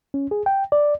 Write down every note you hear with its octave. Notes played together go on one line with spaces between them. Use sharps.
C#4
G#4
G5
D5